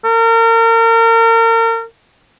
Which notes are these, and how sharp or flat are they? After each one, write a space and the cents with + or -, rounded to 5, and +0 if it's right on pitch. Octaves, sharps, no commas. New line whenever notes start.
A#4 -35